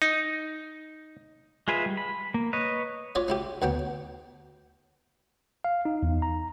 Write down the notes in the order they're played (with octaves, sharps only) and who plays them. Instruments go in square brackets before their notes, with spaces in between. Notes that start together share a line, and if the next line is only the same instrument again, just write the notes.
[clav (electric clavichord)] D#4
[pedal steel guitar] G#3 F4 G#4 B4 E5
G3
B5
A#3
B4 C#5 D#5
[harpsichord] C#4 F4 C#5 D5
C#4 E4 G4
D2 B3 C#4 G5
[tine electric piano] F5
D#4
E2
A#5